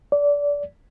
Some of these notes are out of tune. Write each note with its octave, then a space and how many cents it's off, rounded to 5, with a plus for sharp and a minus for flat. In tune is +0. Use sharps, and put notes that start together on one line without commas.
D5 -25